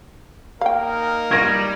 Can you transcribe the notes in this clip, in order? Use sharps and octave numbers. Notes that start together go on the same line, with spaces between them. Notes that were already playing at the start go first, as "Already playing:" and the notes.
A#3 D#4 A#4 F5 G5
G3 G#6 A#6